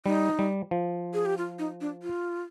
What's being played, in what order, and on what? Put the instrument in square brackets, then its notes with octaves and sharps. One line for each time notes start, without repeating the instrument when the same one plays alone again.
[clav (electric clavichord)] G3 [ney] D#4
[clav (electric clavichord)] G3
F3
[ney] G#4
G4
F4
D#4
D4
F4